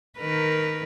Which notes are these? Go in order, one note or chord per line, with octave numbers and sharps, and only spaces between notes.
D#3 A#4 B4